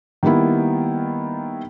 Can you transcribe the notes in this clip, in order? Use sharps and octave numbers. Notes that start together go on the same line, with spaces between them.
D#3 G3 A#3 B3 E4